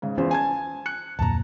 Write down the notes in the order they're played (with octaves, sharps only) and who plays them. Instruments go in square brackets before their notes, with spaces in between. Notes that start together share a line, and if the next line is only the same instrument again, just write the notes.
[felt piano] G#2 C#3
[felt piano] E2 F4 C5 [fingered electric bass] C#4
[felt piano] G#5 A5 G#6
F#6 C#7
[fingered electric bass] D1 F2 A#2 [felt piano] A5 A#5